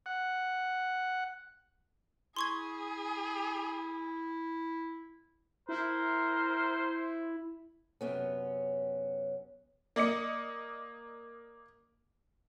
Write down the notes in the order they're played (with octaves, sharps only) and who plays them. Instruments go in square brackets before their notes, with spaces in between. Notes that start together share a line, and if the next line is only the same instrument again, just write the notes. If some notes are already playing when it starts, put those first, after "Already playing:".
[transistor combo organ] F#5
[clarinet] E4 [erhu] G#4 [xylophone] C6 C#6 G#6
[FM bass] E4 [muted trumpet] A#4 [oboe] C5
[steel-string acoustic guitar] F#2 C3 B3 C#4
[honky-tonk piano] A#3 D5 D#5 C#7